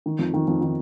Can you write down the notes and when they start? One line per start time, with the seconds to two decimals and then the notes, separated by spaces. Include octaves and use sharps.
0.06 D#3
0.19 F2
0.34 D#3
0.48 F2
0.61 D#3